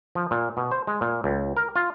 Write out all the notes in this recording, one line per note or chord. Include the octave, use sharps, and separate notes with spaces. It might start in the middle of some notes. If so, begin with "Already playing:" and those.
F3
A#2
B2
C5
G#3
A#2
C#2
A#4
F4